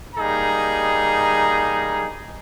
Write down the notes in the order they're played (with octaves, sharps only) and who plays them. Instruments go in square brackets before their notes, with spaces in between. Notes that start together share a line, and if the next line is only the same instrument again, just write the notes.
[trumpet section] G3 A#3 D#4 G#4 A#5